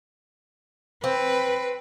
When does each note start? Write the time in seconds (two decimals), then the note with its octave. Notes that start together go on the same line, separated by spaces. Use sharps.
1.04 C4 B4